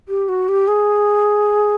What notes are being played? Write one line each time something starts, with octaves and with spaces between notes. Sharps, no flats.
G4
F#4
G4
G#4